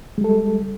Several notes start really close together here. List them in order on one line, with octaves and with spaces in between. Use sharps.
G#3 G3 A4